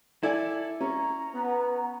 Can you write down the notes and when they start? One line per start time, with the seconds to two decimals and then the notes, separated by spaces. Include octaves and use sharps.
0.23 E4 A4 D5 G#5
0.81 C#4 A#5
1.35 B3